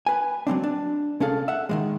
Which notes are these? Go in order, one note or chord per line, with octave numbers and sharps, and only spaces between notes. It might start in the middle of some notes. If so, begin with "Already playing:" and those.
B4 G#5
F#3 G#3 C4 D4
D4
C2 C#4 G#4 A4 F5
E5 F#5
D#3 F#3 G#3